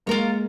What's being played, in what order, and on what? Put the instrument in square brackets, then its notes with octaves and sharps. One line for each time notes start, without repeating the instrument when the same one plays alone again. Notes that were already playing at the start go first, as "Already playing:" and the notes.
[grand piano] G#3 A#3 [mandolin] F4 A#4 C#5